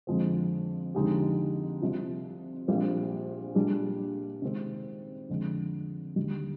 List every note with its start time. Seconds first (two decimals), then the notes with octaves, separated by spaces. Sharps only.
0.07 F2 D3 F3 G#3 C4
0.94 F2 D3 G#3 D#4 G4
1.82 C2 C3 F3
2.68 A#1 A#2 G3 C4
3.55 A#2 G3 D4 G#4
4.42 C3 D#3 G#3 C4
5.29 F2 D3 G#3
6.16 D#2 D3 G3